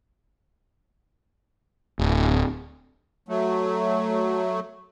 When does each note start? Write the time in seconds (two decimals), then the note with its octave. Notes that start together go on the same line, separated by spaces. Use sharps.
1.99 D1
3.29 F#3 A3